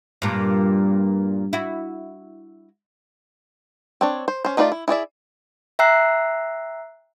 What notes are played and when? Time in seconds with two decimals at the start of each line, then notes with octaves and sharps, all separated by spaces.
0.22 G2 A#2
1.53 E4 F#4
4.01 C4 D4 C#5
4.28 C5
4.45 C#4 C5
4.57 A3 D#4 F4 B4 D5
4.72 E4
4.88 E4 G#4 D5 E5
5.79 E5 G5 A#5 E6 F#6 C7